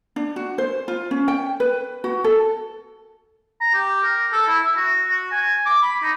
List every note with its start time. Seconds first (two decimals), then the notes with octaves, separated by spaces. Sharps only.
0.16 D4
0.36 F#4
0.58 C5
0.88 F4
1.11 C#4
1.28 G5
1.60 B4
2.04 F#4
2.24 A4
3.60 A#5
3.74 G4
4.03 A#4
4.32 A4
4.48 E4
4.64 E5
4.76 F#4
5.08 F#4
5.32 G#5
5.66 D6
5.82 B5
6.02 D#4